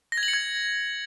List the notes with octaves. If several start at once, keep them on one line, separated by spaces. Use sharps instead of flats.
A#6
G#6
F#7
C#7
G#6